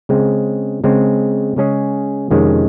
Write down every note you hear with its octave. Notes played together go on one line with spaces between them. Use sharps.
C#3 G#3 C4
C#3 G#3 C4
C#3 G#3 C#4 G#4 C#5
F2 C3 D#3 G#3 C#4